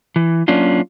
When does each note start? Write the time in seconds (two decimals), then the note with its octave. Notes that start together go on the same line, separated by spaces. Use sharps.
0.16 E3
0.48 F#3 A#3 C#4 D4 F4